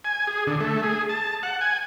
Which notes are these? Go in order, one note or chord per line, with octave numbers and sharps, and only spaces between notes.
G#5
G#4
D3
A3
G#4
A5
F#5
G#5